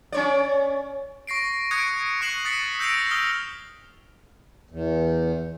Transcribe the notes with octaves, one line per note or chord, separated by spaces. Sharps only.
C#4 C#5 D5
C#6 A#6 C7 D7
C#6 D#6 F#6 G#6 C#7 D7
C#6 F#6 C7 E7 F#7
D#6 F#6 A6 B6 C#7
E6 G6 A#6 C7 D7 F7
D#6 F6 G7
E2